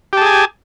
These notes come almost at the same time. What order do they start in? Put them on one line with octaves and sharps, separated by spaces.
G4 A5 G#4 G#5